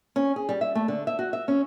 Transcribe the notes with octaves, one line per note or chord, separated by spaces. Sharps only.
C#4
G#4
G3
E5
A3
D3
E5
F#4
E5
C#4